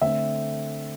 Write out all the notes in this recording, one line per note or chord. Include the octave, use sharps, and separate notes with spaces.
D3 A3 C4 E5